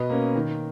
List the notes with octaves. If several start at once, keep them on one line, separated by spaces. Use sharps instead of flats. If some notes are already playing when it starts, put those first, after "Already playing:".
Already playing: B2 B4 D#5
A#3 C#4
D#3